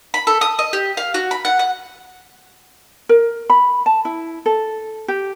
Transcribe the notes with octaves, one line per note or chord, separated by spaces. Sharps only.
B5
A4
D#6
D#5
G4
F5
F#4
B5
F#5
F#5
A#4
B5
A5
E4
A4
G4